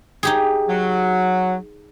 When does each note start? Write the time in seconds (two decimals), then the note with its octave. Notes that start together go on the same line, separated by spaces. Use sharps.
0.23 D#4 G4 G#4
0.69 F#3